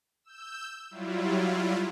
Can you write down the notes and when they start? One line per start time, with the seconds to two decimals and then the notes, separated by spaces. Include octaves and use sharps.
0.24 E6 G6
0.91 F#3 G3 E4 F4